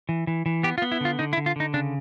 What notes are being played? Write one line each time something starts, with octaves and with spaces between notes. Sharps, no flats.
E3
E3
E3
B3 G4
F4
B3
E4
D3 F4
D3 D#4
E4
D3
F4
D3 D#4
C#3 D4